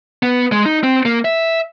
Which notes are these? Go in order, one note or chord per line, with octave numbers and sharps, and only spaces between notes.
B3
G#3
D#4
C4
A#3
E5